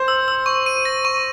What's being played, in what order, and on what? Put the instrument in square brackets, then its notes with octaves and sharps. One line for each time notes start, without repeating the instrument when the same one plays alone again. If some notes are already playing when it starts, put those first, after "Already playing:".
Already playing: [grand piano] C5
[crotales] E6
E6
C#6
D#7
A#6
C#6